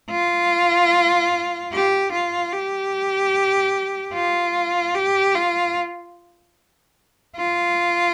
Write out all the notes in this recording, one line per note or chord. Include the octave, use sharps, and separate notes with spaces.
F4
G4
F4
G4
F4
G4
F4
F4